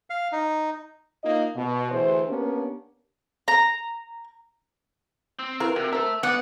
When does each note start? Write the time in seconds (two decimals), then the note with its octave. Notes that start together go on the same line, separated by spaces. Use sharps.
0.10 F5
0.32 D#4
1.24 A#3 D#4 F4 D#5
1.56 B2
1.92 D2 E3 G#4 C5
2.28 A#3 B3 C#4 D4 G4 A#4
3.48 A#5
5.39 C4
5.60 E4 F4 A#4 B4
5.76 C3 F#3
5.93 A4 C5 E5 A#5
6.23 D2 B3 D5 F#5